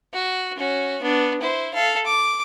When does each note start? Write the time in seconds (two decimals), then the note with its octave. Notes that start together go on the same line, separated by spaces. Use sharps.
0.13 F#4
0.57 C#4 F#4
1.02 B3 D4
1.41 E4 C5
1.74 A4 F5
2.06 D6